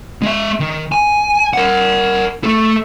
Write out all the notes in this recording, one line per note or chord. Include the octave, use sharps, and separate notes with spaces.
G#3 E5
D#3
G#5
A#4 F#5
A3 A4